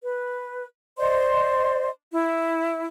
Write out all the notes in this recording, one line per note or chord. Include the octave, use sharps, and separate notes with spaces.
B4
C5 D5 D#5 C6
E4